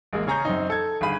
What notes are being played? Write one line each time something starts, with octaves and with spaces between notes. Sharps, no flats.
A1 G#3 A#3
C#3 C#4 G#4 A#5 C#6 G6
F#2 C4 D#4
A4 G#6
G1 D#3 G#4 F5 B5 D#7